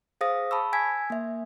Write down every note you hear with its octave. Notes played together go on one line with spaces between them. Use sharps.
G#4 C5 F5 D#6 A#6
A5 B5 C#6 E6
G#5 E6 G#6 B6
A#3 E5